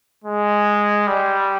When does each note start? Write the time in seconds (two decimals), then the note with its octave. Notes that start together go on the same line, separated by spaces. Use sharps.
0.24 G#3
1.07 G3